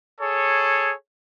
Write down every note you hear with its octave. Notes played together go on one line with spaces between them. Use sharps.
G#4 A4 C#5